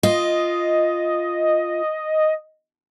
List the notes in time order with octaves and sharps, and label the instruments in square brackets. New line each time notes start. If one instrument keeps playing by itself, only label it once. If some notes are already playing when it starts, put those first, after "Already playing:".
[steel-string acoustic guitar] F4 [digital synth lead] D#5